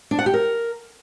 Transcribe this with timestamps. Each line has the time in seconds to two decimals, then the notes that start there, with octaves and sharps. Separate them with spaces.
0.11 D4
0.19 F#5
0.26 G4
0.34 A#4